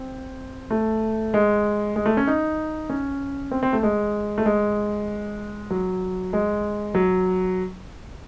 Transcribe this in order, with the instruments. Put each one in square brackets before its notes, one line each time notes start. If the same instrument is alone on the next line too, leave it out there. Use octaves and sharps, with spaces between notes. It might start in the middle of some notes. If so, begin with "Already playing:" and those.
Already playing: [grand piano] C4
A3
G#3
G#3
A3
C#4
D#4
C#4
C4
C4
A3
G#3
A3
G#3
F#3
G#3
F#3